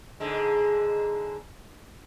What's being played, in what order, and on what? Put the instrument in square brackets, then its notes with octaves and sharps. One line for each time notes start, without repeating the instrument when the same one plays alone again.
[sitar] G#2 D3 G#3